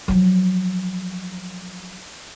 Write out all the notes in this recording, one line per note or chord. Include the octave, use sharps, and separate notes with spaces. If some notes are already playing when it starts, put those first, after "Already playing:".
F3 F#3